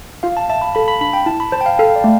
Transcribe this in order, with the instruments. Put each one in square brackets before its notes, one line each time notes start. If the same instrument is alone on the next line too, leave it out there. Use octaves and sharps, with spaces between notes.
[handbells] F4 [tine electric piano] F5
[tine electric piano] A5
[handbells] E5 [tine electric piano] A5
[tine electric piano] B5
[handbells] A4 [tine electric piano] B5
[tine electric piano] B5
[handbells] D4 [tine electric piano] B5
[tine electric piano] G5
[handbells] E4 [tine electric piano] A5
[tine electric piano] B5
[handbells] C5 [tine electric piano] A5
[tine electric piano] G5
F5
[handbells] A4 [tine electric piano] F5
[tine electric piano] D5
[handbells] A3